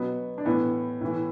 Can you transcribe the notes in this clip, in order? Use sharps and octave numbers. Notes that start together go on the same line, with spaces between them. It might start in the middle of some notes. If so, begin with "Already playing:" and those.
Already playing: B2 F#3 B3
D4
A2 E3 B3
A2 E3